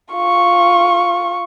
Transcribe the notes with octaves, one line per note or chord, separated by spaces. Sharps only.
F4 C#6